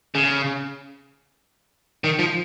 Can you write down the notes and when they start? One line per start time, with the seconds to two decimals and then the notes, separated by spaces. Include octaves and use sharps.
0.15 C#3
2.04 D#3
2.19 F3